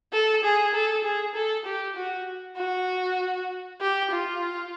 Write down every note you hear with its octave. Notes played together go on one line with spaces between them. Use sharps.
A4
G#4
A4
G#4
A4
G4
F#4
F#4
G4
F4